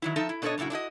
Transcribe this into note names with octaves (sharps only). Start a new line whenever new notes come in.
D#3 F#3 E4
F3 D#4 A4 E5 A5
E4
B2 D4 A4 A#4 C#5 D#5
F#2 A#2 C#3 E4 F#4
D4 E4 F#4 D#5